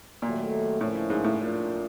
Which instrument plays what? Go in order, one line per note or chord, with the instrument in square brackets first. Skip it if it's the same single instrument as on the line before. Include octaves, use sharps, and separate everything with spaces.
[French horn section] D#2 D#3 F#3 A3 [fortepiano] A#2
[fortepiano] A2 [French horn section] D3 F3 A#3 C#4 E4
[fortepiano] G#2
A2
[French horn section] F3 A#3 D4 F4